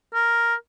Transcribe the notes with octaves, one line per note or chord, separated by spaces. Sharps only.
A#4